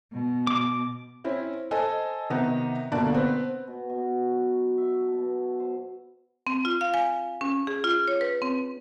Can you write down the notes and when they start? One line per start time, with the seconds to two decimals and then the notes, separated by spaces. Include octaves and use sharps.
0.13 B2
0.47 D6
1.24 C4 C#4 E4
1.71 A4 C5 D#5 G#5
2.30 C3 D#3 B3 D#4
2.92 G1 B2 D3 A#3 D5 A5
3.12 B3 C4 B4
3.67 B2
3.90 B2
4.31 F#3
4.78 E5
5.00 A5
5.13 B2
5.60 C5
6.47 C4
6.65 F4
6.81 F5
6.94 G#5
7.41 C#4
7.67 G#4
7.84 F4
8.08 C#5
8.21 B4
8.42 C4